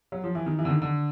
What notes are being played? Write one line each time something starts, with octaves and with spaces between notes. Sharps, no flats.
F#3
F3
E3
D#3
E3
D3
D#3
D3